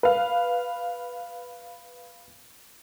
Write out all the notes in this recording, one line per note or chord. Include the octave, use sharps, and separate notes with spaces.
B4 F5